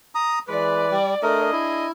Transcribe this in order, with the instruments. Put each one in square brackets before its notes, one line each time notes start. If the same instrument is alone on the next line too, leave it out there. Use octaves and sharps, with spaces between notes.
[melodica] A#5 D#6
[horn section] E3 B4 [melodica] G#3 [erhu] D5
[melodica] G3
[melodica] A3 A#4 [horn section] D4 G#4 D#5
[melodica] E4